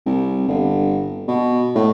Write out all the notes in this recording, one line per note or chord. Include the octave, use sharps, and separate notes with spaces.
C2
G1
B2
A2